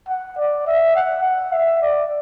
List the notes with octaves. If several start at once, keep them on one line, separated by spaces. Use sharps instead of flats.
F#5
D5
E5
F#5
F#5
E5
D5